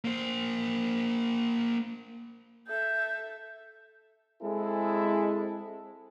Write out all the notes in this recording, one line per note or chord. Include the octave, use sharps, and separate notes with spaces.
A#3 C5
A4 E5 G6
G#3 C4 E4 G#4 A4